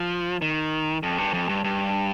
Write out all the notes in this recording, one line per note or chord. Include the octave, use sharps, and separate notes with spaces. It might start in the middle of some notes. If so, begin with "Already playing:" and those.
Already playing: F3
D#3
F2
G2
F2
G2
G2